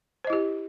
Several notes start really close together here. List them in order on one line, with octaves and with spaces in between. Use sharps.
C5 D#5 E4 G4